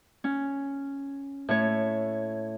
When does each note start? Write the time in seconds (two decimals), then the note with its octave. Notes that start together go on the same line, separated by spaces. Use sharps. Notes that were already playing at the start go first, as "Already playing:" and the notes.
0.24 C#4
1.48 A2 A3 C#5